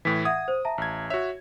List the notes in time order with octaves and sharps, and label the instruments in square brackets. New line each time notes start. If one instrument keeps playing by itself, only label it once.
[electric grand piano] A2 E3 [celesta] B6
[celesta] E5 F#5 G#6 [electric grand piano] D#6
[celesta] C5
E5 A5 A#5
[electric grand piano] A1 G#6
[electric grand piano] F#4 E5 [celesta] C#5 F7